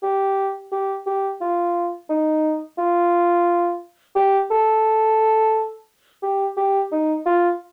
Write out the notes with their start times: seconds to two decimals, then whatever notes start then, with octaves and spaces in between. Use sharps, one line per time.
0.03 G4
0.72 G4
1.06 G4
1.41 F4
2.10 D#4
2.78 F4
4.16 G4
4.51 A4
6.23 G4
6.57 G4
6.92 D#4
7.26 F4